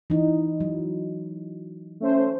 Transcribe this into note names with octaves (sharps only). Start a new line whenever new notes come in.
E3 D#4
F#3
A3 C#4 C5